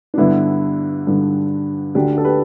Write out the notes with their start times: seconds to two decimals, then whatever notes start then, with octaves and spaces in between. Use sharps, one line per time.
0.14 D4
0.18 G2 D3 B3 E4
1.07 G2 D3
1.95 D2 D3 D4 G4
2.18 A4
2.25 G4 B4